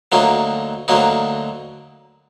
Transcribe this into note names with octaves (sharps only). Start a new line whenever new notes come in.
D2 D3 F#3 A#3 D#4
D2 D3 F#3 A#3 D#4